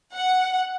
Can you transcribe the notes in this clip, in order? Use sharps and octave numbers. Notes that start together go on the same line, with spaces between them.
F#5